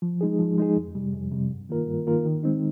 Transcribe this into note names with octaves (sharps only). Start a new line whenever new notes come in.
F3
G#3 D#4 G#4
F3
G#3 D#4 G#4
F2
C3 G3
F2
C3 G3
G2
D#3 A#3 F4 A#4
G2
D#3 A#3 F4 A#4
D#3
G#3 C4 D#4